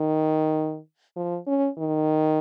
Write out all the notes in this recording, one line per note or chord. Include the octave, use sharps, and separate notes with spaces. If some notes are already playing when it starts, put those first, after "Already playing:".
Already playing: D#3
F3
C#4
D#3